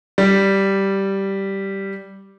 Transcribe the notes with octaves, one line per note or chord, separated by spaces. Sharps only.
G3